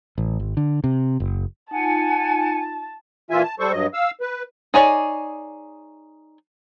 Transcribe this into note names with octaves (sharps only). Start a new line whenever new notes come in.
A1
G#1
D3
C3
F#1
D#4 F4 F#5 G#5 A5
A#2 E3 F4 E5 G#5
A5
G3 A4 C5 C#6
G2 F#3 D#5
F5 E6
B4
D#4 G#4 C#5 D5